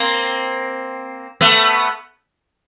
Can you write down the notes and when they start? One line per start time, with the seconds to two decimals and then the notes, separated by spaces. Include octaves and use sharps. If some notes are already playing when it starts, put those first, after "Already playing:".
Already playing: A#3 C4
1.41 A3 B3